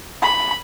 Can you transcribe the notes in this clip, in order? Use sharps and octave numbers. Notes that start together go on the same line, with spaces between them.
B5